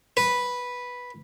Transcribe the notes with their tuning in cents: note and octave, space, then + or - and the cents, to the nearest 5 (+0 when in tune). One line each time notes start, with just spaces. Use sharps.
B4 -5